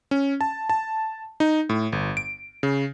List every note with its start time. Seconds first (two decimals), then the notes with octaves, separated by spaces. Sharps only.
0.11 C#4
0.41 A5
0.70 A5
1.40 D#4
1.69 A2
1.92 G1
2.17 D7
2.63 C#3